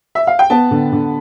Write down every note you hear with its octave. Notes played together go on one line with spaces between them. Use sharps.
E5
F5
G5
B3 A5
D3
D3